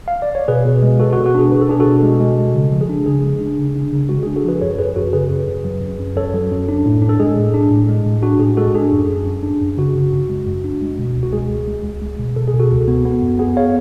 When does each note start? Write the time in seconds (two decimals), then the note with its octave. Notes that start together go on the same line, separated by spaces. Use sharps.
0.08 F5
0.22 D5
0.35 C#5
0.48 B2 G#4 B4
0.65 B2
0.82 G#3
0.99 B2 F#4 A4
1.13 F#4
1.17 B2
1.26 F#4
1.35 D4 G#4
1.52 B2 B4
1.61 A4
1.69 D4 G#4
1.80 F#4 A4
1.86 B2
2.03 G#3
2.20 G#3
2.38 G#3
2.55 C#3
2.72 F3
2.81 G#4
2.89 D4
3.06 C#3 G#4
3.23 G#3
3.41 D4
3.59 C#3
3.76 D4
3.93 C#3
4.09 G#3 F#4
4.23 D4 G#4
4.36 F#4 A4
4.45 F3 G#4 B4
4.61 F#2 A4 C#5
4.79 F#2 G#4 B4
4.96 F#2 F#4 A4
5.13 C#3 G#4 B4
5.30 F#2
5.47 F#2
5.65 F#3
5.82 F#2
5.99 F#2
6.16 F#2 A4 C#5
6.34 F#3
6.51 F#2
6.69 D4
6.86 A2
7.02 D4
7.09 A4
7.20 G#3 G#4
7.37 A2
7.54 D4
7.71 A2
7.89 G#3
8.06 A2
8.23 D4 F#4
8.40 A2 G#4
8.57 G#3 F#4 A4
8.75 D4 G#4
8.92 F#2
9.09 F#2
9.26 F#2
9.43 D4
9.61 F#2
9.77 C#3 F#4
9.96 C#3
10.12 F#2
10.30 G#3
10.46 F#2
10.64 D4
10.82 G#3
10.99 B2
11.16 C#2
11.23 F#4
11.33 G#3 G#4
11.50 C#2
11.68 G#3
11.84 C#2
12.02 G#3
12.19 B2
12.36 B2 A4
12.48 G#4
12.53 B2
12.60 F#4 A4
12.71 C#2
12.88 B3
13.05 B3
13.22 F#2
13.39 B3 G#4
13.57 C#5 F5